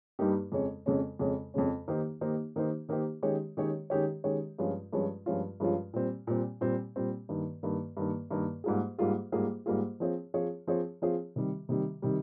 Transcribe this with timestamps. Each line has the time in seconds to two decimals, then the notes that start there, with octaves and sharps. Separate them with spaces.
0.19 G2 G3 A#3 D#4 G4
0.52 F2 C#3 G#3 C#4
0.86 F2 C#3 G#3 C#4
1.19 F2 C#3 G#3 C#4
1.54 F2 C#3 G#3 C#4
1.88 D#3 A#3 D#4 G4 C5
2.21 D#3 A#3 D#4 G4 C5
2.56 D#3 A#3 D#4 G4 C5
2.89 D#3 A#3 D#4 G4 C5
3.23 D#3 G#3 C#4 G4 C#5
3.57 D#3 G#3 C#4 G4 C#5
3.90 D#3 G#3 C#4 G4 C#5
4.24 D#3 G#3 C#4 G4 C#5
4.58 G2 F3 G#3 C#4 F4
4.93 G2 F3 G#3 C#4 F4
5.26 G2 F3 G#3 C#4 F4
5.60 G2 F3 G#3 C#4 F4
5.94 A#2 G3 C4
6.27 A#2 G3 C4
6.61 A#2 G3 C4
6.96 A#2 G3 C4
7.29 G2 D#3 A#3
7.63 G2 D#3 A#3
7.97 G2 D#3 A#3
8.31 G2 D#3 A#3
8.64 G#2 G3 A#3 F4 G#4
8.98 G#2 G3 A#3 F4 G#4
9.32 G#2 G3 A#3 F4 G#4
9.66 G#2 G3 A#3 F4 G#4
10.00 F3 C4 F4 G#4 C#5
10.34 F3 C4 F4 G#4 C#5
10.67 F3 C4 F4 G#4 C#5
11.02 F3 C4 F4 G#4 C#5
11.36 C3 D#3 G3
11.69 C3 D#3 G3
12.02 C3 D#3 G3